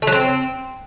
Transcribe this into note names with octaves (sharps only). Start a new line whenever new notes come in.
A3
F#3
C4